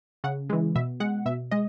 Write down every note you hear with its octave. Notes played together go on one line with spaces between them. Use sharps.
C#3 F#5
E3 G#3
B2 E5
G#3 F#5
B2 E5
G#3 D#5